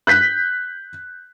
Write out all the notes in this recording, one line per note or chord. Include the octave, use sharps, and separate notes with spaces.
F#6 G6 B6